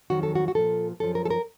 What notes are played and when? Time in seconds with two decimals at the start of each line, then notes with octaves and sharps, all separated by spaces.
0.10 F2 D#3 F#3 F#4
0.23 A4
0.35 F#4
0.48 F#4
0.55 A#2 F3 A4
1.00 F#2 F3 A4
1.15 A#4
1.25 A4
1.30 A#4